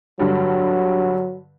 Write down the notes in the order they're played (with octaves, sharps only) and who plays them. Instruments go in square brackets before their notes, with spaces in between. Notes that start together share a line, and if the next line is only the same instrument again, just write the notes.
[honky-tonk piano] G2 D3 G3 [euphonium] F#3